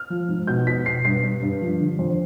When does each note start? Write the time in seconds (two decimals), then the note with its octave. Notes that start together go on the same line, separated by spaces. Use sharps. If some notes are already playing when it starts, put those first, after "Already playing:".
Already playing: F6
0.10 F3
0.29 G#2
0.47 B2 G6
0.67 B2 B6
0.86 B2 C7
1.05 G2 C7
1.23 G2
1.42 G2
1.61 F3
1.80 D3
1.99 F2